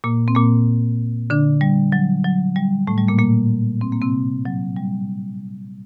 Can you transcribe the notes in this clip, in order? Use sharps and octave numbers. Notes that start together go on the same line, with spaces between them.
A#2 A#3
C4
A#2 A#3
D3 D4
G3
F#3
F#3
G3
A2 A3
G3
A#2 A#3
A#2 A#3
C4
A#3
C3 C4
F#3
G3